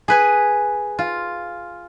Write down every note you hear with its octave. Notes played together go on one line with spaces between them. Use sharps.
G#4 B4 G#5
F4